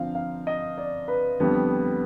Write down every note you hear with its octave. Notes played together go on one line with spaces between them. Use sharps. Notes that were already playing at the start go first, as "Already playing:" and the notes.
Already playing: D3 F3 C4 F5
F5
D#5
D5
B4
F2 D3 G3 B3